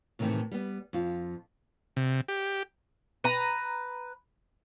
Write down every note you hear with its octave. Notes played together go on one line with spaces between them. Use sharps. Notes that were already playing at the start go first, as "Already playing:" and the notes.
A2 C3 D#3 E3 A3 C4
G3 B3
F2 F4
C3
G4
B4 A#5